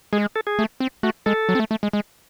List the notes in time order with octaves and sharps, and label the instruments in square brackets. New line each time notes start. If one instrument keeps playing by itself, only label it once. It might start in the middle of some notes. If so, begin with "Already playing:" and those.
[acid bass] G#3 [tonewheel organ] G#4
[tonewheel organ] A4
G#4
[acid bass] A3
C4
[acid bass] A3 [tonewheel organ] F#4
[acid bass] G#3 [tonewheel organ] A4
[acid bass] F#3
C4
A3
A3
G#3
G#3